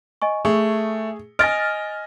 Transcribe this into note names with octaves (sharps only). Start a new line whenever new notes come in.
D#5 G#5 C#6
A3 G#4 C#6
D#5 G#5 F6 A6 A#6 D7